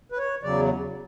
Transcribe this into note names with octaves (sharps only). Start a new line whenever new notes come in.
B4
C#5
E2 C#3 F#3 D5